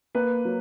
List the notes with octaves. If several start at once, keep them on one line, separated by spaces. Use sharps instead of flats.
A#3 B4
F#3